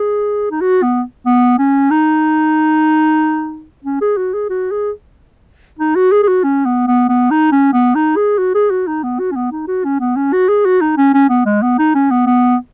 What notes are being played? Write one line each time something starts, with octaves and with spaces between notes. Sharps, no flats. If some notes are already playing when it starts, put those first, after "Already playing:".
Already playing: G#4
D#4
F#4
B3
B3
C#4
D#4
C#4
G#4
F#4
G#4
F#4
G#4
D#4
F#4
G#4
G#4
F#4
C#4
B3
B3
B3
D#4
C#4
B3
D#4
G#4
F#4
G#4
F#4
D#4
B3
F#4
C#4
B3
D#4
F#4
C#4
B3
C#4
F#4
G#4
F#4
D#4
C#4
C#4
B3
G#3
B3
D#4
C#4
B3
B3